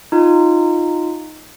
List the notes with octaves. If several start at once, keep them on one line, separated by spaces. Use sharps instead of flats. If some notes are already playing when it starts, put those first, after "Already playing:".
D#4 F4